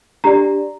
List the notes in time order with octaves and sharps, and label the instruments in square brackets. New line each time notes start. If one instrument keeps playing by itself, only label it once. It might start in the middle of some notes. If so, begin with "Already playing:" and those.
[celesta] D4 G4 D5 A#5